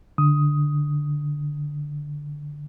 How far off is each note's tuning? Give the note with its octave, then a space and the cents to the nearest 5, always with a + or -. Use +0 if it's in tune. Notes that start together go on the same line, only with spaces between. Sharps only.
D3 +0 D#6 +10